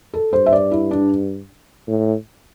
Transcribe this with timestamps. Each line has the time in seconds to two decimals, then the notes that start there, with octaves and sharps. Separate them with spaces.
0.14 A4
0.33 G2 C5
0.46 E5
0.53 D5
0.71 E4
0.91 D4
1.87 A2